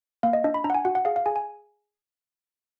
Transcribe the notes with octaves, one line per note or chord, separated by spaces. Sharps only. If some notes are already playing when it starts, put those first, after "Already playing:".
A#3 F5
D#5
D4 D#5
B5
D4 A#5
F#5
G#5
F#4 F#5
F#5
G#4 F5
F5
G#4 G#5
G#5